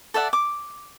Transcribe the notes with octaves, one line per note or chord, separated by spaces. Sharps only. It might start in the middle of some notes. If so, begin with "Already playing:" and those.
A4 D5 E5 F#5
D6